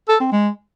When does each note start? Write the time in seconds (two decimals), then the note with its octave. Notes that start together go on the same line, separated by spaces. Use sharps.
0.08 A4
0.20 C4
0.32 G#3